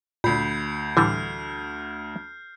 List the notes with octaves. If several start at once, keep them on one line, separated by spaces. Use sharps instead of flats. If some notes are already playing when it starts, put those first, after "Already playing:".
D2 A#2 B5 G6 C7
A2 D3 E3 G3 F6